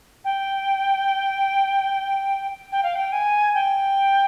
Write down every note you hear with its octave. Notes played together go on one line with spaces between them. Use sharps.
G5
G5
F5
G5
G#5
G5